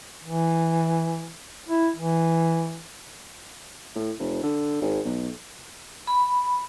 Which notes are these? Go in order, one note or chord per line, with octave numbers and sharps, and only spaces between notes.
E3
E4
E3
A2
F1
D3
G#1
B1
B5